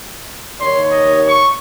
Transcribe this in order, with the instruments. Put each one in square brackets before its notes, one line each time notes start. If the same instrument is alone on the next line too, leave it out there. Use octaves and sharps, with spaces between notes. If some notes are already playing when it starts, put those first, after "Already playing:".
[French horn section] D#2 C#5 [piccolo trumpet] C6
[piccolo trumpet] D#5
C#6